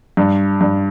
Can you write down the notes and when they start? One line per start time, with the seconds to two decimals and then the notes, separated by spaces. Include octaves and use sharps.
0.17 G2
0.61 G2